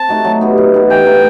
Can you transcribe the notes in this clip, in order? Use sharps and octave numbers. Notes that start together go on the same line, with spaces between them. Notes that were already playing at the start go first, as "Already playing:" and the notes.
Already playing: C4 A5
A3 D#4 F#4
F#3
B3 D#4 G4
F#3
B3 D#4 G4
E3 G5
A3 D#4